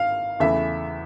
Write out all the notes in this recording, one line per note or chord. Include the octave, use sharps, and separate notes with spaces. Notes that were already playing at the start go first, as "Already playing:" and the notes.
Already playing: G#1 F5
E2 C#3 E3 A3 E5